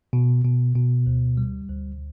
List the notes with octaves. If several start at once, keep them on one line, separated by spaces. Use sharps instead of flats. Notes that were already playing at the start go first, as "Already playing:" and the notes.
B2
B2
B2
D2
G3
D2